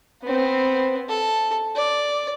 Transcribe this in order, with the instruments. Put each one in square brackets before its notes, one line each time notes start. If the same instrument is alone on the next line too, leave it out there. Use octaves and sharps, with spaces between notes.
[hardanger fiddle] B3 C4
A4
D5